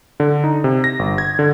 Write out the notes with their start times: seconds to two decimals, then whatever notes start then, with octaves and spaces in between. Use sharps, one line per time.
0.20 D3
0.44 D#4
0.64 C3
0.84 A#6
0.99 G1
1.18 G#6
1.39 D3